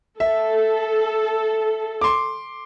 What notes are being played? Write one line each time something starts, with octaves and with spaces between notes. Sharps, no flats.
A4 E5
C6 D6